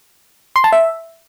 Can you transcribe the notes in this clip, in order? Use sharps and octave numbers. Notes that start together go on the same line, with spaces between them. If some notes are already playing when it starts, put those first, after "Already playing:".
C6
A5
E5